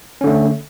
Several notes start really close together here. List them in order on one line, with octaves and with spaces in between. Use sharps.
C#4 D3 A3